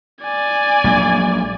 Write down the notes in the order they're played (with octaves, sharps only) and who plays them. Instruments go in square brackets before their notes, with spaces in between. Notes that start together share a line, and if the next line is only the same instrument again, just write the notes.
[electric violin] D5 G#5
[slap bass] A#1 F#3 G#3